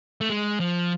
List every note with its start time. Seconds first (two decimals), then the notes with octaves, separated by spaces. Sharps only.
0.21 A3
0.30 G#3
0.60 F3